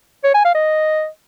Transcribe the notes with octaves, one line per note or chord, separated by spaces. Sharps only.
C#5
G#5
F5
D#5